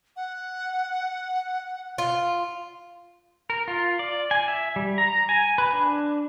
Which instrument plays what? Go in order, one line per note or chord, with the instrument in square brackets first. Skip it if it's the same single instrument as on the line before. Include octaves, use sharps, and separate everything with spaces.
[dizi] F#5
[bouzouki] F4
[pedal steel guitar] A#4
F4
D5
G#5
E5
G3
A#5
G#5
B4
D4